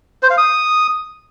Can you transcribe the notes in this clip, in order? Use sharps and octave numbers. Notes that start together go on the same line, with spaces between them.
C5
F5
D#6